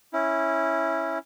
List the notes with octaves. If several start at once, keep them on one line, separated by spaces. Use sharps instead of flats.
C#4 E4